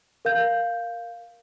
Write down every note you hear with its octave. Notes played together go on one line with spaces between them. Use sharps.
A#4 F5 G6